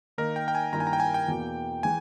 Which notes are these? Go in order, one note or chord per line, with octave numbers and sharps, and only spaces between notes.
D#3 A#3 D#4 A#4
G5
G5
G#5
G2 D#3 A#3 E4 A#5
G#5
A#5
G5
G#5
G5
E2 B2 A#3
E3 G#3 G#5